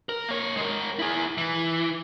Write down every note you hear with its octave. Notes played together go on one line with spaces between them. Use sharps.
A#4
A#3 C#5
G#3 A#4
E4 G#4
E3